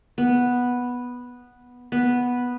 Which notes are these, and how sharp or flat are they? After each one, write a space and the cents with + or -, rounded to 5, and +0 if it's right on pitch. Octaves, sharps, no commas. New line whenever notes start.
B3 -5
B3 -5